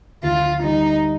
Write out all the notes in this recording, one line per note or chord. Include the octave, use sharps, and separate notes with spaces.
D2 F4
G3 D#4